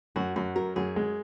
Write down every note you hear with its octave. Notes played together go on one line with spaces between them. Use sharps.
F#2 F#4
F#2 F#4
F#3 A#4
F#2 G#4
G#3